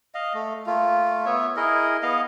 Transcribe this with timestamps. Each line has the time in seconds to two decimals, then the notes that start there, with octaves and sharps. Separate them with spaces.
0.15 D#5 F5
0.34 A3
0.66 A3 A#3 F4
1.26 B3 C#5 E5
1.56 E4 G#4 A#4 D#5
2.03 B3 D#5 F5